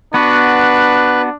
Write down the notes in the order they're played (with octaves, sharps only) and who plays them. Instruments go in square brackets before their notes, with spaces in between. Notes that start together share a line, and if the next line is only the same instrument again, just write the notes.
[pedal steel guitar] B3 F#4 [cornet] D4 [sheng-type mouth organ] B4